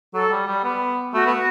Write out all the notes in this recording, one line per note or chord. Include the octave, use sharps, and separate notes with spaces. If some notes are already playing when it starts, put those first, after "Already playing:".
F#3 A4
G3
G3
B3
A3 F#4
B3